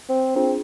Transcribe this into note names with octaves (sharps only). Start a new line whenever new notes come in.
C4
C4 D4 F4 G#4